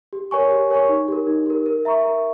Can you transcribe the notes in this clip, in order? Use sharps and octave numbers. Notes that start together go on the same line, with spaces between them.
G4
A#4 C#5 G#5 C#6
G4
A#4 C#5 G#5 C#6
D#4
G4 A#4
D#4
G4 A#4
A#4
E5 A#5 C#6
A#4